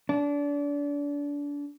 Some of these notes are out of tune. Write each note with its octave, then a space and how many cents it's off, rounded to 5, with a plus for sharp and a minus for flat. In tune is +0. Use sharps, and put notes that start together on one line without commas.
D4 -30